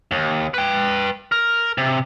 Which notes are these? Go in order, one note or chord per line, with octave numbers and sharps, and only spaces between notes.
D#2
B4 G5
A#4
C3